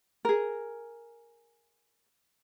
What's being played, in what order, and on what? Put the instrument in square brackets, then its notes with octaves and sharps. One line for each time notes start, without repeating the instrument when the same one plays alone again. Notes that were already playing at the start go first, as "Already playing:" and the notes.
[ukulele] G#4 A#4